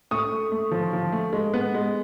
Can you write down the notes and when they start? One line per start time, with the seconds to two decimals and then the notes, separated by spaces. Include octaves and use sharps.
0.11 A3 C#6 D#6
0.31 A3
0.52 A3
0.71 F3
0.93 F3
1.12 A3
1.33 G#3
1.54 B3
1.74 G#3